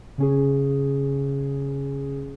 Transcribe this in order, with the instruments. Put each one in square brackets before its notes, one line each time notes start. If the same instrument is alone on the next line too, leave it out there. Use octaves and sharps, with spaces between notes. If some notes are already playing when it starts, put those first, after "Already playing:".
[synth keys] C#3 C#4 G#4